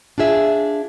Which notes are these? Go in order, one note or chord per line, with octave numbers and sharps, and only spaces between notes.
D4 F4 G#4 E5